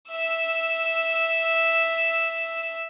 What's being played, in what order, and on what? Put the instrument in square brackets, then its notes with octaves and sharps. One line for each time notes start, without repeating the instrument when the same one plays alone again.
[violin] E5 E6